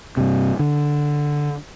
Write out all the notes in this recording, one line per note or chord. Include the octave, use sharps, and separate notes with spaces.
G2 C3
D3